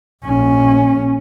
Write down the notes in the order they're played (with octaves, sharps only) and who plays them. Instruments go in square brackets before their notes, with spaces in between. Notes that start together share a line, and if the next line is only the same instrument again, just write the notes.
[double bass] A#1 C#4